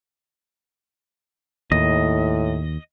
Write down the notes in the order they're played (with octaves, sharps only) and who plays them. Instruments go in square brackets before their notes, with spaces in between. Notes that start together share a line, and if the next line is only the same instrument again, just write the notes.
[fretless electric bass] D#2 [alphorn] A2 [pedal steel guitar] D#5